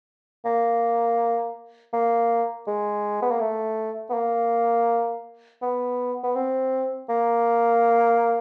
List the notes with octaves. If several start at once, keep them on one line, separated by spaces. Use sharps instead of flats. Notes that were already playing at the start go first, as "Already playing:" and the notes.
A#3
A#3
G#3
B3
A#3
A3
B3
A#3
B3
B3
C4
A#3